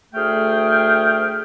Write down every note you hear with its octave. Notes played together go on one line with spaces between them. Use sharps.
D2 A3 G#4 G5 F6